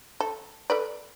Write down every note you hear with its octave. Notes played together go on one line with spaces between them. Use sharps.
A4
A4 B4 D5